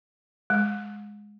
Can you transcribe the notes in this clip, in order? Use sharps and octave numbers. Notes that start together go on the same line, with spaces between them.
G#3